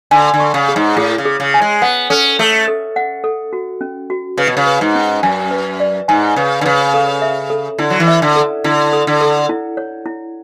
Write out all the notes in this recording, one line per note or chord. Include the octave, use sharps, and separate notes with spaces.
D3 G#5
D3
C#6
C#3
G#4
G#2
A2 G#4
C#3
G#4
C#3
G#5
G#3
B3 F#5
C#4 A4
A3 A4
A4
F#5
A4
F#4
C#4
F#4
C#3 B4
B2
C#3
B4
G#2
C#4
F#2 G#5
B4
D5
G#2 G#5
C#3 B4
D3
C#3 B4
A4
E5
A4
D3 E4
F#3
E3
E5
D3
A4
D3 E4
A4
D3
A4
E4
C#5
E4